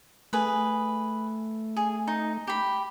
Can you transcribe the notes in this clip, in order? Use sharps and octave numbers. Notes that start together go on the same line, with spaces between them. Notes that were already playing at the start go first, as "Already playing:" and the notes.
A3 G#4 B4
G#4
D#4
G4 B5